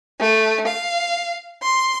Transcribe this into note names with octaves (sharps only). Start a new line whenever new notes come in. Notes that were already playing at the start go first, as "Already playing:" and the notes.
A3
F5
C6